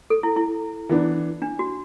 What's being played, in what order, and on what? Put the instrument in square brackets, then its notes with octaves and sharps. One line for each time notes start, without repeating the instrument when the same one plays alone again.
[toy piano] A4
E4
E4
[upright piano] E3 B3 D4
[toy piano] D4
F#4